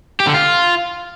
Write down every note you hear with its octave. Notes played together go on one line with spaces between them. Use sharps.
G4
D3
F4